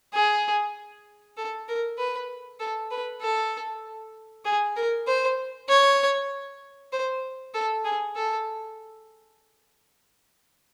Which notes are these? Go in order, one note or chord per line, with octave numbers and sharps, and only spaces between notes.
G#4
A4
A#4
B4
A4
B4
A4
G#4
A#4
C5
C#5
C5
A4
G#4
A4